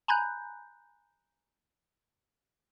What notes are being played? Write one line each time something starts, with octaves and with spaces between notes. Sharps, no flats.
G#5 A#5 B5 F#6 G6